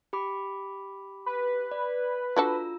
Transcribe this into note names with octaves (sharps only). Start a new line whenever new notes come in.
G4 B5 D6
B4
D5
D4 F4 F#4 A4 A#5 E6